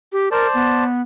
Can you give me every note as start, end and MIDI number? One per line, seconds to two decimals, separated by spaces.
0.12 0.29 67
0.31 0.47 70
0.31 0.84 72
0.31 0.84 74
0.31 0.84 81
0.54 1.02 59